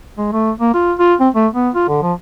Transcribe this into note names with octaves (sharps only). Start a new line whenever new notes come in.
G#3
A3
A#3
F4
F4
C4
A3
B3
F4
D3
F3